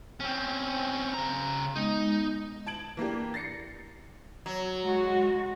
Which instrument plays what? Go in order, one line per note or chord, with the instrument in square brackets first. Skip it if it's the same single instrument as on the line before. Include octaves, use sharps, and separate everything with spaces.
[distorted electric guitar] C4 C#4
C#3 A#5
[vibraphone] G#3 B3 [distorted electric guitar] D#4
[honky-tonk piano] A5 G#6 D7 F#7
E3 A#3 D4 G4
A6 A#6 C7 C#7
[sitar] F#3
[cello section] G#3 F#4